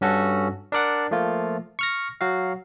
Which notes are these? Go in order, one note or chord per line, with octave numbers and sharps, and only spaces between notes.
G2 C#4 F#4 A4
D4 A#4 D5 F#5
F3 A3 A#3 F4
C#6 F6 A#6
F#3 F#4 F5